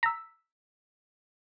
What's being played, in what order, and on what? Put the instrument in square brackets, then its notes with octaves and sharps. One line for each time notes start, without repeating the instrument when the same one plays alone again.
[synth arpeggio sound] A#5 [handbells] E6 B6